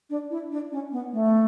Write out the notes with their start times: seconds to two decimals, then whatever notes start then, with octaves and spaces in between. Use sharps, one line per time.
0.10 D4
0.30 E4
0.51 D4
0.72 C#4
0.92 B3
1.13 A3